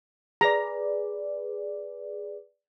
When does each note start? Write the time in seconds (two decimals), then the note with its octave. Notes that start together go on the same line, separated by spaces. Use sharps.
0.41 G#4 B4 D5 A#5